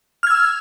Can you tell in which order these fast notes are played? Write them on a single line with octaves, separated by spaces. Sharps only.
F6 G#6 E6